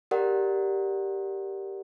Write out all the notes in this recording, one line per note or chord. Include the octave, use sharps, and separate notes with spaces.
G4 A#4 D5 F#5